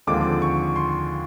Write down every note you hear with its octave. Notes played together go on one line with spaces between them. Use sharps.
D#2 D3 F3 G#3 C4 D6
C#6
C6